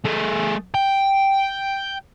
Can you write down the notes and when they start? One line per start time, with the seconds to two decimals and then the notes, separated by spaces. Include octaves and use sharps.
0.05 A3 G#4
0.74 G5